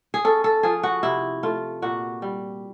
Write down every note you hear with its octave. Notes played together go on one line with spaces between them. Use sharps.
G#4
C#4 A4
A4
F3 G#4
F#4
C3 E4
A3 F4
A#2 F#4
G3